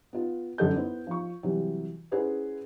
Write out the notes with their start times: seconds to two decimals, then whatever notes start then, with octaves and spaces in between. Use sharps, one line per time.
0.13 B3 F4
0.58 G1 F#2 A4 F#5 G6
0.75 B3 E4 C5
1.07 F3 C#6
1.43 C3 E3 F#3 G3
2.12 C#4 E4 G#4 B4 C5 F#5